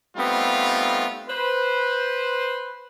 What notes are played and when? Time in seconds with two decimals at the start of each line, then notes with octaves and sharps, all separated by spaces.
0.17 G3 A3 B3 C4 D#4 F4
1.29 B4 C5